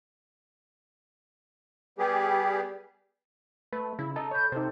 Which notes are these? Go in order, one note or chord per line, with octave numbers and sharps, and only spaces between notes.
G3 B3 G4 G#4
A3 B4
C#3 E4
A4 D#5 A5 A#5
C#5 B5 G6
C3 D#4 A4 C5